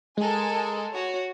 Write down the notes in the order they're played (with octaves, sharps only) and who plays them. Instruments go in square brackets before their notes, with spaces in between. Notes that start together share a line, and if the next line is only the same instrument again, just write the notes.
[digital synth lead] G#3 [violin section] A4 A#4 G#5
[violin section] F#4 C#5